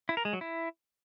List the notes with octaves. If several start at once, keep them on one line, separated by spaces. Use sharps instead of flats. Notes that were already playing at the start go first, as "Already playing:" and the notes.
E4
A#4
G#3
F#3
E4